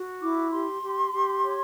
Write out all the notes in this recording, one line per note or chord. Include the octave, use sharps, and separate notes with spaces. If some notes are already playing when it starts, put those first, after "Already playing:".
Already playing: F#4
E4 D6
G4 C6
G4
G4
C#5